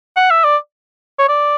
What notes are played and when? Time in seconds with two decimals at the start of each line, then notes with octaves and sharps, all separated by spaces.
0.16 F#5
0.30 E5
0.44 D5
1.19 C#5
1.29 D5